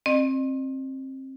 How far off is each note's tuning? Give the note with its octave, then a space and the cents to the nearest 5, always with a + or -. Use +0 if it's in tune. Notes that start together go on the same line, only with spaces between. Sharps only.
C4 +25 D#5 -45